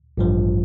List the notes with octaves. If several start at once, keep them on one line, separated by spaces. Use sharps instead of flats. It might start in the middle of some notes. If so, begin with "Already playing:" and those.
A1 G2 F3